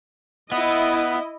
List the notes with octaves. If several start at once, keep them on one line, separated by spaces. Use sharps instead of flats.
B3 E4 D#5